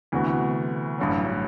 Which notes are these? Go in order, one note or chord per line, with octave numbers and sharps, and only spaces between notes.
D2 C3 E3 B3 F#4
A1 G2 F#3